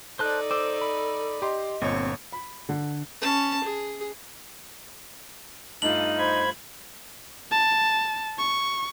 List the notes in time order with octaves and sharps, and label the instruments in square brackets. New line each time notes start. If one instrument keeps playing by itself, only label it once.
[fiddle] D#4 D5 [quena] A4 [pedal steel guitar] C5 A5 F#6
[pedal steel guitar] C5 [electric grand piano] D6 E6
[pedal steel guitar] B5
[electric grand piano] G4 C6 [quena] D#5
[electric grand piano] G1 A#2 C#5 [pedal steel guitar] C4 [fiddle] C#6
[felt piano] B5
D3
[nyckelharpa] C#4 A5
G#4
[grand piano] G2 A3 F4 [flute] D#4 [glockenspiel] F#7
[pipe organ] C5 B5 G#6
[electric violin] A5
C#6